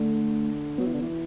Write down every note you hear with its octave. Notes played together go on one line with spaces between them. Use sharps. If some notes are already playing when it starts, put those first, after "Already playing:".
Already playing: D3 A3
F#3 B3
E3
D3
E3